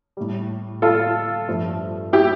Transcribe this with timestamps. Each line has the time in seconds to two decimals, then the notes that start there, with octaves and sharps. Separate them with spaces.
0.17 A2 G3
0.82 F4 A4
1.48 G2 F3 A3
2.13 E4 G4